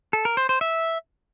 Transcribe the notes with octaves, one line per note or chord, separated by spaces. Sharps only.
A4
A#4
C5
C5
E5